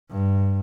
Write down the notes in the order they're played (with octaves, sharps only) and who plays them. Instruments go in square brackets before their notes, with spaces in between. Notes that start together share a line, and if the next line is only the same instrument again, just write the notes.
[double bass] G2